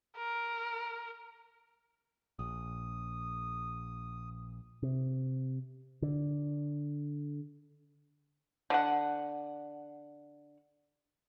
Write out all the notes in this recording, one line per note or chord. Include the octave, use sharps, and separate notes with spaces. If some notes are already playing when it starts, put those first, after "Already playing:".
A#4
A#1 D#6
C3
D3
D3 F#5